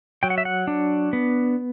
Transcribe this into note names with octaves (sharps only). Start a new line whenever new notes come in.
F#3 G5
F#5
E5
F#5
D4
B3